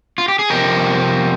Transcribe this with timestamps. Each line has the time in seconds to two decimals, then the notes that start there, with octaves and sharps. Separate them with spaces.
0.18 F4
0.28 G4
0.39 G#4
0.50 F2 C3 F3 G4 A#4